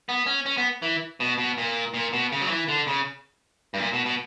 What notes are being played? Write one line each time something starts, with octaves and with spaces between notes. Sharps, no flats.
B3
C#4
C#4
B3
E3
B2
B2
A#2
A#2
B2
C#3
F#3
E3
D3
C#3
G2
A#2
B2
B2